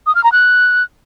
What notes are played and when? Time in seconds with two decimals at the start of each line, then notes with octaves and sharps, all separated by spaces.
0.06 D#6
0.15 F6
0.24 A#5
0.32 F#6